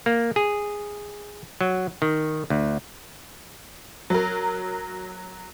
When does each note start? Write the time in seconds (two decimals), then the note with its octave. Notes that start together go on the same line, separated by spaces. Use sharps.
0.06 A#3
0.36 G#4
1.61 F#3
2.02 D#3
2.50 D2
4.10 F#3 A#4